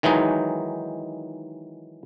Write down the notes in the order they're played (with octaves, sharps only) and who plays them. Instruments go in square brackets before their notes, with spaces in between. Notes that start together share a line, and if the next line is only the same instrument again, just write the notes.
[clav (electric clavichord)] D#3 E3 F#3 G#3 D#4